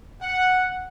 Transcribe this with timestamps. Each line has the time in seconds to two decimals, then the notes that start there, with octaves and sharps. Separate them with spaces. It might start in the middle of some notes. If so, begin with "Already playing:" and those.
0.22 F#5